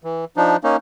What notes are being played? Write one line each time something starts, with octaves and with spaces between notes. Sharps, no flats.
E3
F3 D4 D#4
A#3 C#4 D#4